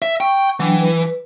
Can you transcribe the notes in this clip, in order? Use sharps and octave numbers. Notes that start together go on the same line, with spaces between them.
E5
G5 C#6
E3 F#3 D4 G5
B4